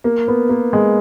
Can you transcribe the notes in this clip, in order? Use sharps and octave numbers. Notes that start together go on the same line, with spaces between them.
A#3
B3
A#3
G#3